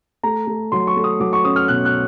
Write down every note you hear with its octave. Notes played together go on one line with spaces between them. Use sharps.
A3 A#5
A3
F#3 C6
C#6
A3
D#6
F#3 D6
C#6
C#4 D#6
F6
B2 F#6
F#6